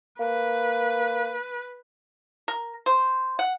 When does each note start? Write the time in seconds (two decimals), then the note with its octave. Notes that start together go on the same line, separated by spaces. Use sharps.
0.20 A#3 B4
2.48 A#4
2.86 C5
3.39 F#5